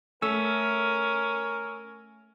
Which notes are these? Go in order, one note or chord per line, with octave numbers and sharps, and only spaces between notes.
A3 C#4 A#4 E6